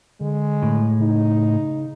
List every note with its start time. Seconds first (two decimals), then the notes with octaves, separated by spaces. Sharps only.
0.21 D3 G#3
0.63 A2
1.00 C#3 D#4